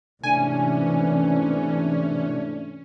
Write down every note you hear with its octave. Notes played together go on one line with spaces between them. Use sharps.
G#2 C3 E3 A3 C#4 D4 G#5